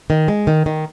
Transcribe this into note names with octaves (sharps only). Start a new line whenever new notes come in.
D#3
G#3
D#3
D#3